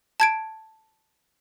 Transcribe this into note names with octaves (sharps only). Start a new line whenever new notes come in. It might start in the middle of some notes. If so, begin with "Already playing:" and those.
A5 G#6 D7